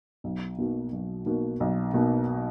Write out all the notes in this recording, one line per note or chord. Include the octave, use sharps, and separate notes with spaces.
B1
B2 A#3 D#4 F#4
B1
B2 A#3 D#4 F#4
B1
B2 A#3 D#4 F#4